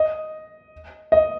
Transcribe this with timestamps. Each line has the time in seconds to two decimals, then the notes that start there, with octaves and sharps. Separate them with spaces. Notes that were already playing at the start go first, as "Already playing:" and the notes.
Already playing: D#5
1.12 D#5